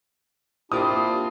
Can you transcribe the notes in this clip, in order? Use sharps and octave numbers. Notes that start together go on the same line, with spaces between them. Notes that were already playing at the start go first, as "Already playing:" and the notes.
A#3 C4 D4 E4 F4 G4 D#6